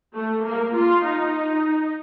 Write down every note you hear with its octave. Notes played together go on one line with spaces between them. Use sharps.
A3
A#3
F4
D#4